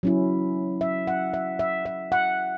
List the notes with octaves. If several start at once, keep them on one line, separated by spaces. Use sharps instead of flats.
F#3 C#4 E4
E5
F#5
E5
E5
E5
F#5